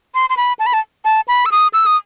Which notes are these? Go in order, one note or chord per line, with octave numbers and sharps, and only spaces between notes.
C6
C6
B5
A5
B5
A5
A5
B5
E6
D#6
E6
D#6